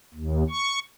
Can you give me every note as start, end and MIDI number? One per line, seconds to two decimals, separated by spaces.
0.14 0.43 39
0.50 0.79 85